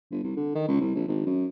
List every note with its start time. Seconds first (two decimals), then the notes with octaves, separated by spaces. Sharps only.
0.11 G1
0.23 C2
0.36 D3
0.55 D#3
0.68 C#2
0.81 C2
0.95 A#1
1.08 G#1
1.26 F#2